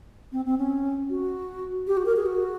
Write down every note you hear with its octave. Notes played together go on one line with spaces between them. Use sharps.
C4
C4
C#4
F#4
G4
F#4
A#4
G#4
F#4